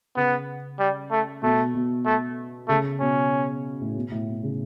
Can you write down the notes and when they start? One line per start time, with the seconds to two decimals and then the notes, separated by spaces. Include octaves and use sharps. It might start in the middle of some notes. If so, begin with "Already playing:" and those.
0.16 C#3 B3
0.80 G3
1.11 A3
1.42 B2 A3
1.74 B2
2.06 A3
2.69 C#3 A3
3.00 B2 C#4
3.81 A2
3.96 B2
4.12 A2
4.27 B2
4.43 C#3